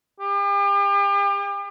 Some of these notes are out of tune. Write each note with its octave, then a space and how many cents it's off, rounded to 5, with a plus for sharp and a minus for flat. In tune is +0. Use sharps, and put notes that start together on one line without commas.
G4 +40